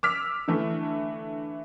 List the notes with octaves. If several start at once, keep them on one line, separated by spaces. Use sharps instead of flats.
D6 E6 F6 B6
D3 E3 A3